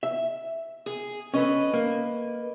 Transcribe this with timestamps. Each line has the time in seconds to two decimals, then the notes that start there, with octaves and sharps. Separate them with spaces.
0.03 E5
0.86 G#4
1.34 C#4 A4 B4 D#5
1.74 A#3